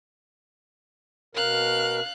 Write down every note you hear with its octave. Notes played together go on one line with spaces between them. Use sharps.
B2 A#4 F5 F#6